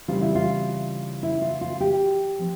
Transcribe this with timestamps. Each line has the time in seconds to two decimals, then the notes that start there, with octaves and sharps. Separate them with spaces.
0.08 C#3 E3 G3 C4 F4
0.21 E4
0.35 F4
1.23 E4
1.42 F4
1.61 F4
1.80 G4
2.39 F3 C4